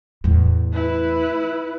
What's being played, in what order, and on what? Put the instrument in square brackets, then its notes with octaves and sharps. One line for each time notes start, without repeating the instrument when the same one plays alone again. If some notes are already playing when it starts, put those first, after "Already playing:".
[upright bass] E2 A2
[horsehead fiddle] E4 B4